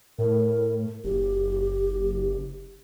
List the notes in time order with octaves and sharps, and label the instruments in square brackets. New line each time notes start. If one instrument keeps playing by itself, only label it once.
[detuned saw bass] A2 [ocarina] A#4
[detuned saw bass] F#1 [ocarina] G4